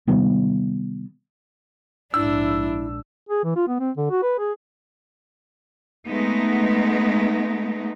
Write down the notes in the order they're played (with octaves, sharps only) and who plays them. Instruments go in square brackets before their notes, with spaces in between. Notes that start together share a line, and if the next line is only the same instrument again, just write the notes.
[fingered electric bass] C3 D#3 G3 B3
[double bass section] A#1 G#2 [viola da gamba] D4 [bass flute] E4 [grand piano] E6
[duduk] G#4
E3
F4
B3
C4
D3
F#4
B4
G#4
[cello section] G#3 A3 B3 D#4